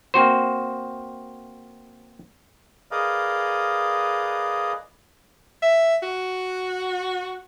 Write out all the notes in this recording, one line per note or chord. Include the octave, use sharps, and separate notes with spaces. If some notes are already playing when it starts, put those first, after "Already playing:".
A#3 C4 F#4 C5
G#4 A#4 B4 D5 D#5 F5
E5
F#4